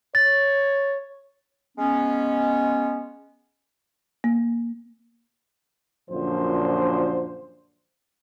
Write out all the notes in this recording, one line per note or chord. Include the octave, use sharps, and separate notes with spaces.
C#5 A6
G#3 B3 C#4
A#3
F#2 A#2 D3 F3 C5